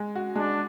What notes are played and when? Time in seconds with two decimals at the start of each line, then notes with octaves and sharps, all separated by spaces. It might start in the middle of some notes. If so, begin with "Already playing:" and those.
Already playing: G#3
0.15 F#4
0.35 G#3 D4